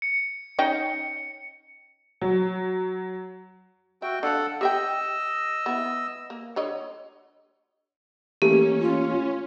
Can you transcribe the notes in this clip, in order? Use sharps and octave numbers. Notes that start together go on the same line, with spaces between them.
C#7
C#4 D#4 G5
F#3
F#4 E5 G5
D4 A4 F5 F#5
G4 D#5 E5 G5 E6
B3 E4
A#3
D3 C#5 D#5
E3 A3 A#3 C#4 G4
F4